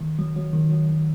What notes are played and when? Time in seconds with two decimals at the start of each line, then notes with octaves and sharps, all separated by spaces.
0.01 D#3
0.19 F#3
0.36 F#3
0.53 D#3
0.71 F#3
0.89 F#3